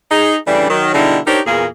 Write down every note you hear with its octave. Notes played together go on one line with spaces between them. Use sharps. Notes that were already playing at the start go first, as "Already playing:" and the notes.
D#4 G#4
C#3 E3 G3 A3 D4
D#3 F#3
B2 D3 G3 D#4 E4 G#4
D4 D#4 G4 A#4 C5 C#5
E2 A#2 A#3 G#4